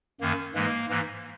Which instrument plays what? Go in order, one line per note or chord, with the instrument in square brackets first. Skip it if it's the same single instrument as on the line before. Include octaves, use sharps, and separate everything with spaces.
[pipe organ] F#2 D#3 A#3
G#2 E3 G#3 A#3
G#2 E3 A#3